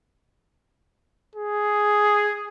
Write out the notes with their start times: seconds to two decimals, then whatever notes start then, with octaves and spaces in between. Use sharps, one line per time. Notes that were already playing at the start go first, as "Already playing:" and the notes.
1.36 G#4